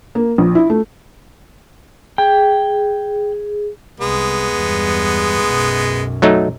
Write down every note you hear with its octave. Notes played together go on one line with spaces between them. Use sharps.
A#3
A#1
E4
A3
G#4 G5
C2 G#3 B3
E2 G2
B1 F#2
F#3 A3 D#4